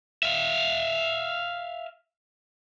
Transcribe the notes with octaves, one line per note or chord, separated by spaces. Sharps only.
E5 F5